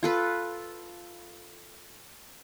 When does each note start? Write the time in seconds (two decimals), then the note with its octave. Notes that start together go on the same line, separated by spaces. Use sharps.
0.03 F4 A4 B4